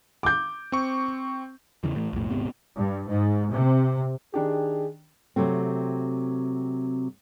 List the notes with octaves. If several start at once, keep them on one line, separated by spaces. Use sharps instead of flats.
D6 G6
C4 C#6
E2 C#3 E3
A2 E3
B1 F2 A2
D#1 G#2 C3 B3
G2
G#2
C3
D#3 D4 G4 G#4
C3 F#3 A3 C4